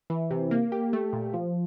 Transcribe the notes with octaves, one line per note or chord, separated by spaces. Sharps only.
E3
C3
A#3
G4
A3
A#2
F3